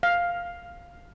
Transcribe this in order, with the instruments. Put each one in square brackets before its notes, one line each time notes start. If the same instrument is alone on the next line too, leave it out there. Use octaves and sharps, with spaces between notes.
[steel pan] F5